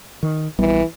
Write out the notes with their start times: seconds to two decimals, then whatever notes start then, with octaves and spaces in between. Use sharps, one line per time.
0.23 D#3
0.59 A#1 E3 G3 B3